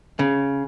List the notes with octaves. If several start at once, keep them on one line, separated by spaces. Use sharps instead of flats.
C#3